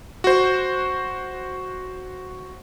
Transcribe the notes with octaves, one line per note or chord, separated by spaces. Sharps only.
F#4 C5